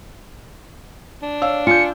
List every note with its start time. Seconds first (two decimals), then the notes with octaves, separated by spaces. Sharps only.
1.22 D4
1.42 C#5 F5 E6
1.67 F4 G#5 G6 C#7